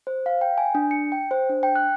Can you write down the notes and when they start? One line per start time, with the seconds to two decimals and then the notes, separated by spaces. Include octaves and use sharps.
0.07 C5
0.26 F5
0.41 G5
0.58 G#5
0.75 D4
0.91 C#7
1.12 G5
1.31 C5
1.49 D4
1.63 G5
1.76 F#6